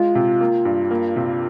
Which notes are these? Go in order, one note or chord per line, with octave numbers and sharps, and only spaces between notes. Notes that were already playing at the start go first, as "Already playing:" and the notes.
Already playing: G#3 F4
C3
A#3
G2
A#3
C3